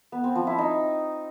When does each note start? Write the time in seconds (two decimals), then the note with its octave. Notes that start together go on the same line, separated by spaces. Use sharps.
0.12 B3
0.24 C4
0.35 F3
0.47 E4
0.58 D#4